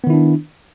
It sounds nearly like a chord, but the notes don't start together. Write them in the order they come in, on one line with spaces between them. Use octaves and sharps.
B3 D#3 E4 D4